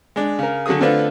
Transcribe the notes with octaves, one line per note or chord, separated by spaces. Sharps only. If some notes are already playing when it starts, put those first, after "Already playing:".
G#3 D4
C#3 A#4
D3 F#3 F#4 G#4 D#6
D3 A3 C4 D4 F4 B4